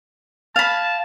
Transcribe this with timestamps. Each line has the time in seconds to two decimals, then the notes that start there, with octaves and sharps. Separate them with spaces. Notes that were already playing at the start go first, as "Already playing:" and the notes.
0.56 F5 A5 B5